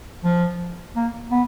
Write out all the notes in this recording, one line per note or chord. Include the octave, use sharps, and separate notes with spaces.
F3
A#3
B3